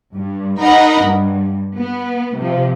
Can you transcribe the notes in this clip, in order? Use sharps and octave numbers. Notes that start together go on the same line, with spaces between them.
G2
D#4 A#4 D#5 F#5 B5
G2
B3
C3 F3